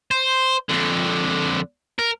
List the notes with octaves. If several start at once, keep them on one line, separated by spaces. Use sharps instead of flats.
C5
F2 D3
A#4